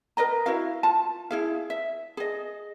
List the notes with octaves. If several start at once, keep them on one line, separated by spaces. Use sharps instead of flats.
A#4 B4 D#5 A#5
E4 F#4 F5
F4 A5
E4 G#4 F5
E5
G#4 D#5